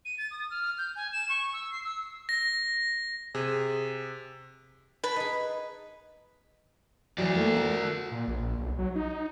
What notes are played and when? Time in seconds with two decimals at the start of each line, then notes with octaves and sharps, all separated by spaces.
0.05 D#7
0.18 A6
0.31 D#6
0.50 F6
0.78 G6
0.96 G#5
1.13 E7
1.29 C#6
1.53 E6
1.71 C7
1.84 E6
2.29 A#6
3.35 C3 G#4
5.04 B4 A5
5.16 D#4 G#4
7.18 E3 F#3 F#4 D5
7.35 A3 A#3
7.56 A#4
8.12 A#2
8.28 A#1
8.58 B1
8.78 F#3
8.95 D#4